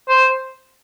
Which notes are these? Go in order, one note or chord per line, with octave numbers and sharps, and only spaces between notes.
C5